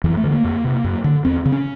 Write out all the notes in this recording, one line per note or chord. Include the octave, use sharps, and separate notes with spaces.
F2 E3
A3
D3
A#3
F2
C3
F#2
D3
E2 C4
C#3
C#4